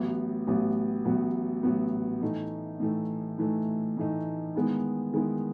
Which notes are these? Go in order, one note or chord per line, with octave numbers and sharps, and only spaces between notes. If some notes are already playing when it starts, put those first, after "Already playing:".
Already playing: A1 A2 F#3 B3
A1 A2 F#3 B3
A1 A2 F#3 B3
A1 A2 F#3 B3
A2 E3 A3 D#4
A2 E3 A3 D#4
A2 E3 A3 D#4
A2 E3 A3 D#4
D#3 G#3 B3 E4
D#3 G#3 B3 E4